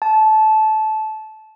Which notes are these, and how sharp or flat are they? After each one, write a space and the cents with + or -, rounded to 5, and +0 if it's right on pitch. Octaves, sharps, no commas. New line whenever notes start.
A5 -20